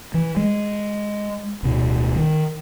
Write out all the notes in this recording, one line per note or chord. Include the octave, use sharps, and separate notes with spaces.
E3
G#3
D1 B2
D#3